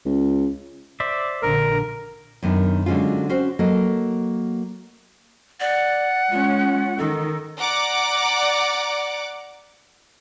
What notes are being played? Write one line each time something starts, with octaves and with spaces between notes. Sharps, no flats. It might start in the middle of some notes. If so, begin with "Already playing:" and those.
C#2
C5 D5 E5
A#1 D3 A#4
F#2 D#3 B3 D4
D3 F#3 G#3 C#4 F4
C4 C#4 F#4 C5
F#3 A#3 A4 D#5
D5 F#5
G#3 C#4 F4
D#3 A4
D5 F#5 A#5 D6